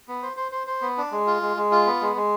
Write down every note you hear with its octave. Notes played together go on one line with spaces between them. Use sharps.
B3
C5
C5
C5
C5
B3
D4
G#3
F4
G#3
G#3
F4
B3
G#3
G#3